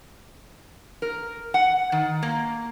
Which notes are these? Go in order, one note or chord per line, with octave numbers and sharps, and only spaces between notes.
A#4
F#5
D#3
A#3